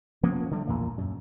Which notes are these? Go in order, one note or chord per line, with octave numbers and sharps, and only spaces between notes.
F3 A#3 B3 C#4
D3 G3 A3
A#1 E2 A#2 A#3
F#2